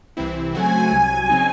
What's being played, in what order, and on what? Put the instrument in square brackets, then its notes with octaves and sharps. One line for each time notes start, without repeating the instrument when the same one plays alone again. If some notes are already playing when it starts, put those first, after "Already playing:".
[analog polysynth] C2 C3 E3 C4 E4
[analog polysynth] C#3 F#3 A3 C4 F#4 [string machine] G#5
[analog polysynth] C2 C3 F#3
C#3 F#3 C4 D#4